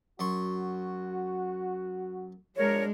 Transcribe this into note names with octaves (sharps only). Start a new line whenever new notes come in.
F#2 F#4 C6 C#6
B2 F3 G#3 D4 A#4 C#5